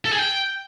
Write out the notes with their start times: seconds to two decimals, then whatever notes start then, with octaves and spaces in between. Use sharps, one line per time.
0.05 A4
0.12 G#4
0.19 G5